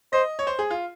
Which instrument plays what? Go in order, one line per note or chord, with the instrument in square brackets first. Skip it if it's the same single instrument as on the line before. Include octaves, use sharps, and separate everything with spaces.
[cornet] C5 [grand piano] D#5
[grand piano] C#5
C5
G#4
F4